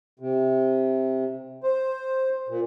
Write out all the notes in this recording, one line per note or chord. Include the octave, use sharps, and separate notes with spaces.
C3
C5
A#2